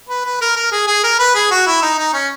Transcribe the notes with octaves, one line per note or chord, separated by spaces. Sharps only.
B4
B4
A#4
A#4
G#4
G#4
A#4
B4
G#4
F#4
E4
D#4
D#4
C#4